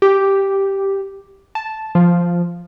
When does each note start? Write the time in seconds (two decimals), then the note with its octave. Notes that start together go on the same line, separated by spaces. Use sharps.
0.02 G4
1.55 A5
1.95 F3